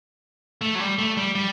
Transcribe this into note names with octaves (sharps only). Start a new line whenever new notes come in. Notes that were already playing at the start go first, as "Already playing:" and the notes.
A3
F#3
G3
A3
G3
G3